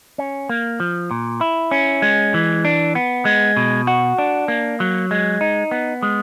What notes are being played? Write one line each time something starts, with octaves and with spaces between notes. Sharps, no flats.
C#4
A#3
F3
A#2
E4
C#4
G#3
E3
D4
B3
G#3
B2
F#4
D4
A#3
F#3
G#3
D#4
B3
G#3